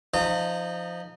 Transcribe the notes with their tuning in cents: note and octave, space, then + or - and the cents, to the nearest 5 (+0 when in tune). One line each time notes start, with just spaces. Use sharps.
F3 -10 D#4 -15 A#5 -45